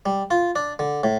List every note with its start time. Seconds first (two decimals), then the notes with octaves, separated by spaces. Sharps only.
0.06 G3
0.31 F4
0.56 D4
0.79 D3
1.04 A2